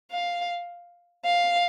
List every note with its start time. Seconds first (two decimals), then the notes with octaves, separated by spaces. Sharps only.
0.11 F5
1.25 F5